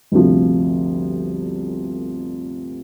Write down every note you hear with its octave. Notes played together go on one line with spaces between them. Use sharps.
G1 D2 C3 F3